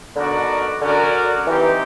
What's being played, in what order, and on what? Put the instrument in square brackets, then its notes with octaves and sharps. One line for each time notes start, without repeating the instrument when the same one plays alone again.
[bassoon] D3 [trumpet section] B3 D#4 F#4 A#4 D5
[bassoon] D3 [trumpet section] C#4 F#4 A#4 D5
[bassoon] E3 [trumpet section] C4 D#4 G4